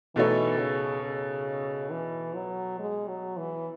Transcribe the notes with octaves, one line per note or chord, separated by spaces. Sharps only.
B2 E3 A3 D#4 A4 C#5
C#3
C#3
E3
F#3
G#3
F#3
E3